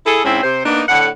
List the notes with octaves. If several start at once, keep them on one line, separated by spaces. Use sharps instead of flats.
E4 G#4 A4
G#2 C4 C#4 E4
C3 C5
A#3 B3 D4 D#4
A2 D3 F#5